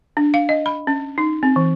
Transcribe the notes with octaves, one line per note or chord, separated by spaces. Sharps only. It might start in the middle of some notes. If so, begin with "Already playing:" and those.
D4
F5
D#5
B5
C#4
D#4
C4
E3